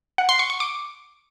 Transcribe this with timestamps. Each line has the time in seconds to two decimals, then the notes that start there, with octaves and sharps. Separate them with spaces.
0.18 F#5
0.29 C6
0.39 C#6
0.50 C#6
0.60 D6